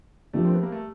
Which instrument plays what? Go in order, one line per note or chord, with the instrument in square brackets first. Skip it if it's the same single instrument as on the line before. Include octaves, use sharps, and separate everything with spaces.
[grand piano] F3 A#3 D4 [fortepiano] G3 A3
[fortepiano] C4
B3
A#3
A3